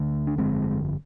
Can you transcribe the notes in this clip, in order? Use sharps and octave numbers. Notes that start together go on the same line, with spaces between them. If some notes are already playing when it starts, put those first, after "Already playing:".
Already playing: D2 D3
D4
G1 F2 D3 G#3 C4